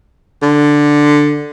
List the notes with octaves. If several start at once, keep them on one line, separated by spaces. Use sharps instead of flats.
D3